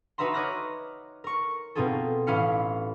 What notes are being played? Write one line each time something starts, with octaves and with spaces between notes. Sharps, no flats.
D#4 F#4 B4 E5 A#5 C6
C#5 D#5 D6 F6 F#6 A#6
A#4 C#6
B2 C4 D#4 F4 G#4 A4
A1 C#4 E4 F5 F6 C#7